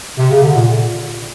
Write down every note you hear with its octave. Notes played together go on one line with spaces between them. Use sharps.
C3
C#3
D3
A#2